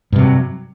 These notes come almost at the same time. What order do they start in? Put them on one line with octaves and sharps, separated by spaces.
G2 C3 F#3